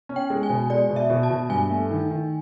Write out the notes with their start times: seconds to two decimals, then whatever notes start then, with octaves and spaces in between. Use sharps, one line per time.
0.09 C#4
0.16 G5
0.30 G#3
0.43 G#5
0.49 B2
0.70 G#3 D5
0.89 B2
0.96 E5
1.10 B2
1.23 A5
1.30 B2
1.49 G2 G#5
1.70 A3
1.91 D#3
2.11 D#3